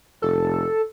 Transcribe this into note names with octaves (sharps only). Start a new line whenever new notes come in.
F1 A4